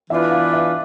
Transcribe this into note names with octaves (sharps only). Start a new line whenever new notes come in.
E3 B3 D4 F4 B4 E5
F5
E5